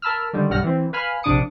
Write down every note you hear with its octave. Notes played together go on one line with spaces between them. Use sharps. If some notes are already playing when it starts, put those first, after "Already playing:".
A#4 A5 B5 E6 F6
D3 D#3 G3
B1 G2 G3 F#5 F6 A#6
E3 C4
B4 F5 G#5 B5 F6
A#1 C3 D4 D6 D#6 C#7